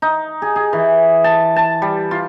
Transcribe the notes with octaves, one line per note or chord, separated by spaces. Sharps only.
D#4
G#4
G#4
E3
A5
A5
G3
F4